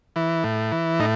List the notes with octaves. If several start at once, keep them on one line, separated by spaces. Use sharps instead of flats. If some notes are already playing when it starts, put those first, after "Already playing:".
E3
A2
E3
A2 D#4